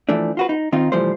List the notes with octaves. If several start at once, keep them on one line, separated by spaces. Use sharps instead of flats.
E3 F3 A3 D4
F4 F#4 B4
D#4
D#3 C4 D#4 F4
C2 E3 F3 G3 A3 C5